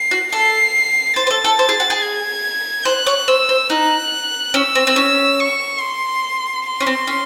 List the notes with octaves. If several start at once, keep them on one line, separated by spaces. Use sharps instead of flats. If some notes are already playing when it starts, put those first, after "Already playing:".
Already playing: C7
F#4
A4 C7
C5 A6
C5
A4
A4
C5
G#4
F#4
G#4
G#6
C5 F#6
C#5
C5 E6
C5
D#4 F#6
C#4 E6
C4
C4
C#4
C#6
C6
C6
C#4
C4
C#4